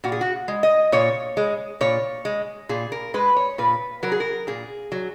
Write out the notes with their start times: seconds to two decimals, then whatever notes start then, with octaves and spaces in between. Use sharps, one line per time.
0.04 A#2 F#4
0.12 G#4
0.21 F#4
0.48 G#3
0.63 D#5
0.92 A#2 C#5
1.37 G#3
1.81 A#2 C#5
2.25 G#3
2.69 A#2 G#4
2.92 A#4
3.14 G#3 B4
3.36 C#5
3.58 A#2 B4
4.03 F#3 A#4
4.12 G#4
4.20 A#4
4.47 A#2 G#4
4.92 F#3